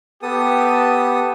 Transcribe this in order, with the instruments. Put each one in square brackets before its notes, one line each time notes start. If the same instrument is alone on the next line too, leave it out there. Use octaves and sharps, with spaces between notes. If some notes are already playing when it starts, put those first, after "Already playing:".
[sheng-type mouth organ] B3 A4 D#6 [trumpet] G4